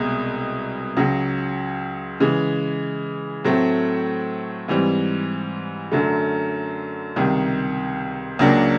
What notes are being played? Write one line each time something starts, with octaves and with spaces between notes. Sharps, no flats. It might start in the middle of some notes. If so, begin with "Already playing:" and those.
Already playing: C2 B2 G#3
C#2 C#3 F#3
C#3 E3 G#3
A2 F#3 A3 C4
G#2 E3 G3 C4
F#2 D3 F#3 A3
C#2 C3 D#3 G3
C#2 C#3 F#3 A#3 D4